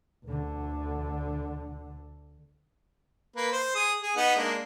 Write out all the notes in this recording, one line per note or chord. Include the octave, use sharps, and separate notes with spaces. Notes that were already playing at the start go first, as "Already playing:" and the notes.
D2 D3
A#3 B4
C5
G#4 D#6
G#4
B3 D#4 F#5
G#3 A#3 D4